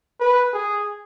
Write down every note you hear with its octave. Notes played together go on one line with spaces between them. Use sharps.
B4
G#4